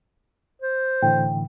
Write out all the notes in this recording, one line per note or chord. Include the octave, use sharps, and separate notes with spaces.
C5
A2 D3 E3 G5